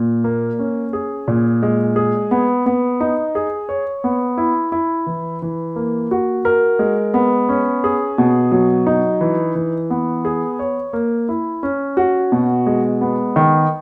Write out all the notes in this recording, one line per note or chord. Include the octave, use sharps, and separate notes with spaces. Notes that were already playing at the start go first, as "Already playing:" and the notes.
Already playing: A#2
A#3
C#4
G#4
A#2
G#3
G#4
B3
B3
D#4
G#4
C#5
B3
E4
E4
E3
E3
A#3
F#4
A#4
G#3
B3
C#4
G#4
B2
F#3
D#4
E3
E3
B3
G#4
C#5
A#3
E4
C#4
F#4
B2
G#3
B3
D#3